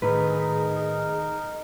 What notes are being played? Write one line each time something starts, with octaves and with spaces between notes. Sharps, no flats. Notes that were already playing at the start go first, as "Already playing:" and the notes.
A2 D#3 D#4 G#4 A#4 B4